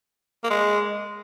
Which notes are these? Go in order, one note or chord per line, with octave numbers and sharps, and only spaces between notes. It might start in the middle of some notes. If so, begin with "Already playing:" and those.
A#3
G#3